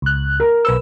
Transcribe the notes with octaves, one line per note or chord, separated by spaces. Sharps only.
C#2 F#6
A#4
B1 B4 E6